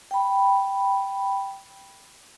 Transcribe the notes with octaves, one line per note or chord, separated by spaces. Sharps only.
G5 B5